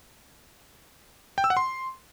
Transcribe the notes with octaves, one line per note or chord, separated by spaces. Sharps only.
G5
E6
F#5
C6